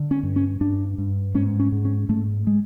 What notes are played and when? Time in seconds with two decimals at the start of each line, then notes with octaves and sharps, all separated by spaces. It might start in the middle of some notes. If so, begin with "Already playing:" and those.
Already playing: D3
0.11 C#4
0.23 G2
0.36 C#4
0.61 G2 D4
0.98 G2
1.34 G#2 C#4
1.60 C#4
1.72 G#2
1.85 C#4
2.09 G#2 A3
2.47 G#3